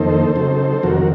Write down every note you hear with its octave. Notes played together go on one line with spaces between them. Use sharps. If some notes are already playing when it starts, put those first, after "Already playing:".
Already playing: F2 D#3 A#3 D#4 A4 C5
C#3 F#3 C4 D#4
F2 C3 D#3 F#3 F#4 A#4